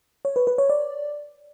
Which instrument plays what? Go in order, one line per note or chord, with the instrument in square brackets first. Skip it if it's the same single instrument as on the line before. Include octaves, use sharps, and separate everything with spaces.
[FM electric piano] C#5
B4
B4
C#5
D5